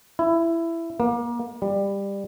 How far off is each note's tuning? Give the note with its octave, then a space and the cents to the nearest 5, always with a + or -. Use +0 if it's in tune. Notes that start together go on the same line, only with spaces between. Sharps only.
E4 +15
A#3 +30
G3 +15